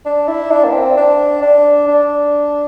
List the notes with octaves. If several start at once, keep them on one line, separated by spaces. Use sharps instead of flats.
D4
E4
D4
A#3
C4
D4
D4
D4